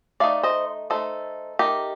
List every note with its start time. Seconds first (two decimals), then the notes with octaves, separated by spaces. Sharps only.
0.20 A3 D#4 D5 F5
0.43 C5 D#5
0.90 A3 D#4 A4 C5
1.59 A3 D#4 G4 A#4